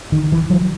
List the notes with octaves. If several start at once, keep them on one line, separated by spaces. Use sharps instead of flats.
D#3
E3
F#3